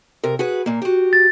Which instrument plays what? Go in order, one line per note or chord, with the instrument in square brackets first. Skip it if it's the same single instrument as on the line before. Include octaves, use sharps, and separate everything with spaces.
[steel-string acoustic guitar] C3 A#4
F#4 G#4 B4
A#2 A#3
F#4 G4
[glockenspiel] A6